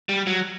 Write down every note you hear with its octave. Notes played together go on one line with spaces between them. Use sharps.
G3
F#3